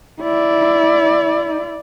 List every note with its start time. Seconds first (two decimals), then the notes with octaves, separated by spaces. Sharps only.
0.21 E4 D5